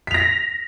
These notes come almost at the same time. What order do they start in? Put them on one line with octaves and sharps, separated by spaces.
B6 F7 A#6